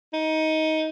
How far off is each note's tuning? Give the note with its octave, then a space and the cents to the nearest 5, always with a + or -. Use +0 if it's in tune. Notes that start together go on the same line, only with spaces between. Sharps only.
D#4 +15